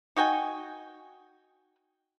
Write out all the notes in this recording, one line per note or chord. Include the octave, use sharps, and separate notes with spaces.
D#4 F#4 G5 G#5